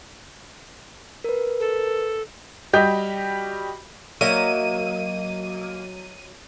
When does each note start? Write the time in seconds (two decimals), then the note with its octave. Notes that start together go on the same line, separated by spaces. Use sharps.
1.24 A#4 B4
1.60 A4
2.73 G3 F#4 G4 D#5 G6
4.21 F#3 A#3 D#5 E5 D#7